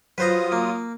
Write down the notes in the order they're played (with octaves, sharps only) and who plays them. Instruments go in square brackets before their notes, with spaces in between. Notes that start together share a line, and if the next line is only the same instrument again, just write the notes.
[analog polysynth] F#3 F4 D#6 [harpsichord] B4 C5 A#5
[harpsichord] A#3